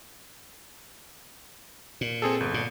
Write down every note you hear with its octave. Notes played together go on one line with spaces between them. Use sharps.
A#2
C4 G#4 A4
G1
A#2